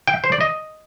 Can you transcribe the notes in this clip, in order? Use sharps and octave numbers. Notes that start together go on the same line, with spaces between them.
G5
C5
D5
D#5